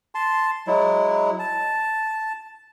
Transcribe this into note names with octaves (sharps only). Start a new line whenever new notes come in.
A5 C6
F#3 G#3 E4
A5